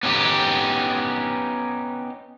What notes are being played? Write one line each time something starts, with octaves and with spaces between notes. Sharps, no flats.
B3 C#4 D#4 G4